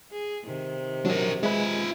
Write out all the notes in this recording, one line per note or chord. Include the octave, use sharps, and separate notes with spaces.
G#4
C3 D#3
F#3 D4 A#4
G#3 F4 B4 E5